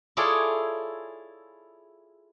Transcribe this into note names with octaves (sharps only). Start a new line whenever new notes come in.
E4 F4 G#4 A4 C#5 D5